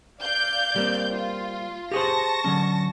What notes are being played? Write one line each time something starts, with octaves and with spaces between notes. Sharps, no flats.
D5 F5 G6
G3 A#3 C4
F4
G4 G#4 C5 A5 C#6 A#6
D3 F#3 C#4